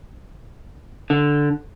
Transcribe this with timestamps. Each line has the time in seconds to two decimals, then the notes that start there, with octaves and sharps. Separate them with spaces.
1.10 D3